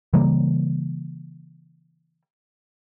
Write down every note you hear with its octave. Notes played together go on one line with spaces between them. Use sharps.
C#3 E3 G3 A#3